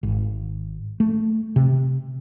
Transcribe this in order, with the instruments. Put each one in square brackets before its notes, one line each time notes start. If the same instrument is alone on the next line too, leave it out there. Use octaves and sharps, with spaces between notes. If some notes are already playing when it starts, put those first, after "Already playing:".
[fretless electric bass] G#1
A3
C3